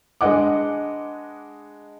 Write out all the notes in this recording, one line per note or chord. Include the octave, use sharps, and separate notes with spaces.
G#3 D4 B4 D#5 F#5 D6